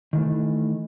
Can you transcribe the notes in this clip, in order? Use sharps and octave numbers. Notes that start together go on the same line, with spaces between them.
D#3 E3 A3